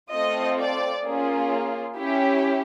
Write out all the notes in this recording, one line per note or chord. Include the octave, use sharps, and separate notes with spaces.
A3 C4 F4 A4 D#5
D5
A#3 C#4 F4 G#4
C#4 E4 G4